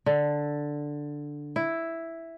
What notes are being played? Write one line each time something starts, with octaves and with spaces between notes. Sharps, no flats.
D3
E4